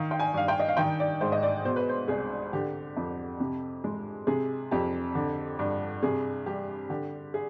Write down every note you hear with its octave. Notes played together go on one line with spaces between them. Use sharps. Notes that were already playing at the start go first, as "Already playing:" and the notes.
Already playing: D#3 F5
G5
G#5
G2 F5
G5
D#5
F5
D#3 G5
D5
G#2 C5
D#5
D5
B2 C5
B4
C5
C2 G#4
D3 G4
F2
C3
G#3
C3 G#4
F2 G4
D3
G2
C3 G#4
G3 G4
D3 G4
G#4